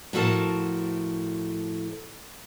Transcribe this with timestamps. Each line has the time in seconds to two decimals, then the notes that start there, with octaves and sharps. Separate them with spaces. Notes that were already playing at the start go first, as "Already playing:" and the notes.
0.13 A2 F3 F#4 A4 A#4 A5